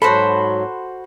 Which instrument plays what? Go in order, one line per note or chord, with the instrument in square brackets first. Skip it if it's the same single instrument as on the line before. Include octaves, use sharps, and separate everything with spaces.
[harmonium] G#2 F#3 [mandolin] F#4 C5 B5 [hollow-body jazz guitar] A4